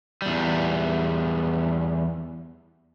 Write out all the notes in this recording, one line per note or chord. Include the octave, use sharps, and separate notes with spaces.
E2 G3